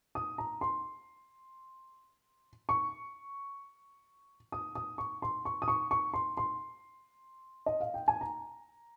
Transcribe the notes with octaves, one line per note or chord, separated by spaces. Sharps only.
D#6
A#5
C6
C#6
D#6
D#6
C#6
C6
C#6
D#6
C#6
C#6
C6
C6
D#5
F5
G5
G#5
A#5